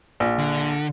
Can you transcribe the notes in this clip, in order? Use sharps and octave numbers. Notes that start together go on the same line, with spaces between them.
A#1
D3